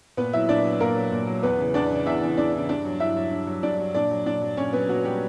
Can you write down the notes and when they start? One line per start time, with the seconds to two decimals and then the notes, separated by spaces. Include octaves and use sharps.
0.17 A#2 B3 B4
0.33 F#3 E4 E5
0.48 A#2 D4 D5
0.65 F#3
0.80 A#2 A#3 A#4
0.95 F#3
1.11 A#2
1.27 F#3
1.43 E2 B3 B4
1.59 C#3 E3
1.74 E2 D4 D5
1.91 C#3 E3
2.06 E2 E4 E5
2.22 C#3 E3
2.37 E2 D4 D5
2.53 C#3 E3
2.69 G2 D4 D5
2.85 F#3
3.00 G2 E4 E5
3.16 F#3
3.31 G2
3.47 F#3
3.63 G2 D4 D5
3.80 F#3
3.95 A#2 D4 D5
4.11 F#3
4.26 A#2 D4 D5
4.42 F#3
4.57 A#2 C#4 C#5
4.73 F#3 B3 B4
4.89 A#2 F#3 F#4
5.05 F#3 G3 G4